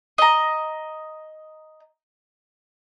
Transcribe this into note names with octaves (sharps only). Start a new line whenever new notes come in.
D#5 A#5